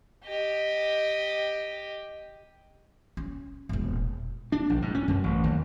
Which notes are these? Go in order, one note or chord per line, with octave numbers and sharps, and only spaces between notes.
G4 D#5
C#4
E1 A#2
D4
A#1
G#2
C#4
F#2
A1
D#2